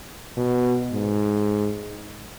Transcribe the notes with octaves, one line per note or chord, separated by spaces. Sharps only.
B2
G#2